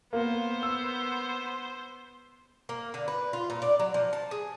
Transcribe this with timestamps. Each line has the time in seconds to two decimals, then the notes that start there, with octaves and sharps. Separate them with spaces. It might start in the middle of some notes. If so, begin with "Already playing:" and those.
0.13 A#3 B3 C5
0.63 E6
2.69 A#3
2.94 D3
3.08 B4
3.33 F4
3.50 A#2
3.62 D5
3.79 F#3
3.94 F3
4.13 A5
4.31 G#4